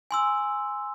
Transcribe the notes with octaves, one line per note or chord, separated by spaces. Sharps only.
G#5 C6 E6